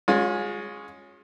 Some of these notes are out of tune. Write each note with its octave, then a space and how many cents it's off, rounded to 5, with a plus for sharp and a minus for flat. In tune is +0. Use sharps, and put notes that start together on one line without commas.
G#3 +0 C#4 +0 F4 +40